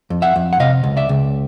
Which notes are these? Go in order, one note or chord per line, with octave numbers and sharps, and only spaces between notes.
F2
E5 F#5
F2
F#5
C3 D#5 F5
C#2
D5 E5
C#2